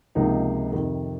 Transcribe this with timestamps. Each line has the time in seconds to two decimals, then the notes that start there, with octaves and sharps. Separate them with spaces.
0.15 C#2 C3 F3 A#3 D#4
0.72 F2 C3 D#3